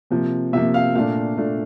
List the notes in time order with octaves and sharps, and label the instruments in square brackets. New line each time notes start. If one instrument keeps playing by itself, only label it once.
[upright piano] C3 F3 A#3
C3 F3 A#3 E5
F5
A#2 A3 D4 F5
A#2 A3 D4